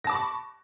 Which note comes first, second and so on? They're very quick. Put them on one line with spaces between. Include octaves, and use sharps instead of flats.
A#6 A5 D6 B5 C#6